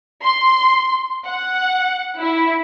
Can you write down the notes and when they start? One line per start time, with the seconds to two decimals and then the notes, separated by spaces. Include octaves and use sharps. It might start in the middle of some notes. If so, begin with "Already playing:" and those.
0.24 C6
1.26 F#5
2.19 E4